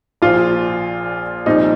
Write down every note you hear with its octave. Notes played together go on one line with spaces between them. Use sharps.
A#1 A#2 F3 F4
C2 A#2 F3 D#4